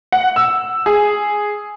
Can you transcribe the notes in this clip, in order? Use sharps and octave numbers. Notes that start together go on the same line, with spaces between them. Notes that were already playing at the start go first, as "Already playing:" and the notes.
F#5
E6
G#4